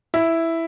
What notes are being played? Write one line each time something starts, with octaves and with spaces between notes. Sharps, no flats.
E4